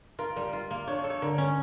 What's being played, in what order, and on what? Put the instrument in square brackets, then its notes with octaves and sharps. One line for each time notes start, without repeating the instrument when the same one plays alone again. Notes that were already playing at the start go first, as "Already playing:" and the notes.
[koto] F4 [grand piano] A#4
[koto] G3 [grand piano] A#4
[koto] F4
A#3
[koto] D4 [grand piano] C#5
[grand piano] C#5
[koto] A4
[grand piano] C#5
[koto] D3 [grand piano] A#4
[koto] C#4